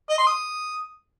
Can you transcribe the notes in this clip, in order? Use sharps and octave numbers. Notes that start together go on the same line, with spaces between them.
D#5
C6
D#6